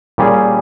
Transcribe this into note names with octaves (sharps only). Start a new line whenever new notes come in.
A#2 G3 C#4 G#4